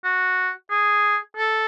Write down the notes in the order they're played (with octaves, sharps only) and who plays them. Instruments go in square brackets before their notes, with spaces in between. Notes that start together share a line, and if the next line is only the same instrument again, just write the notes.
[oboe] F#4
G#4
A4